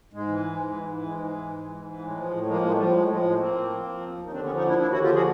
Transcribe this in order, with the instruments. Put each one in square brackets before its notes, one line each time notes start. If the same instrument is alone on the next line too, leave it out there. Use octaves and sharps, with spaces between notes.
[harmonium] G#2 G#3
E3
G#2
E3
G#2
E3
G#2 G#3
E3
G#2
E3
G#2
E3
A2 G#3
F3
A2
F3 G#3 A#3
A2 G#3 A#3
F3 G3
G3
A2 G#3
F3 G#3
A2 G#3
F3 A#3 C4
A2
F3
F3
D#2
D#2
D#4
D3 C4 D4
B3 C#4
F3
C#4 D#4
D#2 D4 E4
D#2 D4 E4
D3 E4 F#4
F4 G4
F3 F#4 G#4